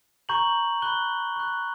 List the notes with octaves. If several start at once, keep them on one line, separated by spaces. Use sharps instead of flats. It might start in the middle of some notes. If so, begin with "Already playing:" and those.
A#5 C#6 G6 F#7
B5 F#6 G7
C#6 F#6